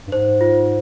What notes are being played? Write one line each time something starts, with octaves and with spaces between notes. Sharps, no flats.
G2
G#2 C5
F4